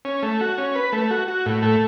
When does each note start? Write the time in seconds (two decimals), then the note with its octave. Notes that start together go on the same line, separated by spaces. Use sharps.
0.05 C#4
0.23 A3
0.41 F#4
0.58 C#4
0.75 B4
0.93 A3
1.11 F#4
1.28 F#4
1.46 A2
1.62 A3